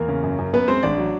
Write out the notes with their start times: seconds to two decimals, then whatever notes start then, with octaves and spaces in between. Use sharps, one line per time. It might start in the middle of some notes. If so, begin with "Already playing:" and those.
Already playing: E2 A#3 A#4
0.08 C#3
0.23 F#2
0.38 F#2
0.53 F#2 B3 B4
0.68 G#3 C4 C5
0.83 A1 D4 D5
0.98 F#3